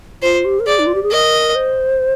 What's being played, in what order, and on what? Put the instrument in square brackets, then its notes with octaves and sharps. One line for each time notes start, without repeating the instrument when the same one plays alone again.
[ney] F4 [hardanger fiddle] C5
[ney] G4
A#4
[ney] G#4 [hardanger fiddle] D5
[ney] D#4
F4
G4
G#4
[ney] A#4 [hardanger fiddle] D#5
[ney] C5